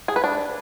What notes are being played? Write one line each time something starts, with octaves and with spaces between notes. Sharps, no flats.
G#4
B4
D4